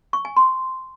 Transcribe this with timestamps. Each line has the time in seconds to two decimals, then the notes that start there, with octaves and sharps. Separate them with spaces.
0.13 C#6
0.25 G#5
0.36 C6